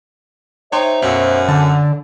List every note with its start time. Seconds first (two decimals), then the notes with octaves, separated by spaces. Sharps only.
0.72 D#4 C5 C#5 E5 G5 C6
1.02 B1 F#2 F#4 E6
1.49 D3 A5